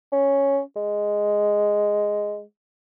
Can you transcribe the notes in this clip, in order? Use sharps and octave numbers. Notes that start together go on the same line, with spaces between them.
C#4
G#3